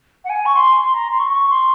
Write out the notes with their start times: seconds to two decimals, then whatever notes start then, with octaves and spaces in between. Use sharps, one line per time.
0.24 F#5
0.29 G#5
0.45 C#6
0.55 C6
0.80 C6
0.94 A#5
1.11 C6
1.19 C#6
1.32 C#6
1.49 C6